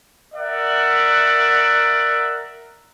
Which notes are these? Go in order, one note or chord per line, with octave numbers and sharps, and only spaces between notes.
A#4 D5 E5 F#5